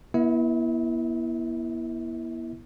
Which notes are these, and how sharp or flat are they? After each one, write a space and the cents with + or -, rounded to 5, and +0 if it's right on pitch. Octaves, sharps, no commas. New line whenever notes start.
B3 -40 E4 +0 E5 -45